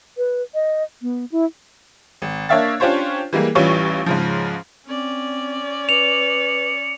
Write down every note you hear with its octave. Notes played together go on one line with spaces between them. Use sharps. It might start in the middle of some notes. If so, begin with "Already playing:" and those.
B4
D#5
B3
E4
G#1
A#3 D4 C#5 E5 F5 A6
C#4 D4 F4 G4 C5 C#5
E3 G3 G#3 A#3
A1 E3 G3 C#4 F4 C#6
G#2 C#3 F3
C4 C#4 D5
B4 C#7 F7